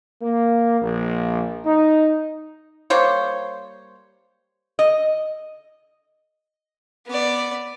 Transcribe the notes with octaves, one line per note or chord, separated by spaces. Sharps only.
A#3
A#1
D#4
G3 A#3 C5 C#5
D#5
B3 D5